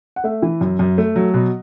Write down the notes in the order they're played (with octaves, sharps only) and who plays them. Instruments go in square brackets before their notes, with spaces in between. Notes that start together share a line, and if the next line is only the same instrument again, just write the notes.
[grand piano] F#5
A3 E5
E3
F#2
F#2
A3
F#3
B2